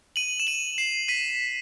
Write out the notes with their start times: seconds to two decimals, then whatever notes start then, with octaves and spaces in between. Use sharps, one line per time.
0.16 D#7 F#7
0.40 E7
0.47 D#7 F#7
0.78 C7 E7
1.08 B6 D#7